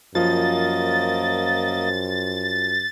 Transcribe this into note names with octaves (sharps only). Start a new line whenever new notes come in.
F#2 F3 A#3 D#5 A6